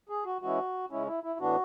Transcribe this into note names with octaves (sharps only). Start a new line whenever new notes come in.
G#4
F#4
E3 G#3 C#4 E4 F#4
C#3 G#3 C#4 E4
E4
E4
A2 E3 B3 D4 F#4